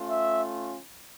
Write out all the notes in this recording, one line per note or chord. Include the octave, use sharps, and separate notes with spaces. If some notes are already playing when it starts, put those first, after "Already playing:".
Already playing: A3 C#4 F4
E5